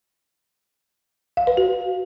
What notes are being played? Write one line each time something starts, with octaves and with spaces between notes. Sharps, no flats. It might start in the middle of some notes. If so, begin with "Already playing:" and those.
F5
B4
F#4